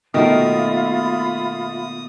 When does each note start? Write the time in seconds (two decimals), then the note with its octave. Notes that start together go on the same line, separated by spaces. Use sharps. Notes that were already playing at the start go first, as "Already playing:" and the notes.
0.14 B2 D#3 A3 A#3 F4 E5 B5 D#6